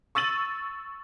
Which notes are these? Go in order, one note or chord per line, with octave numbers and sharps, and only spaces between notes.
C#6 E6 A6 D#7 F#7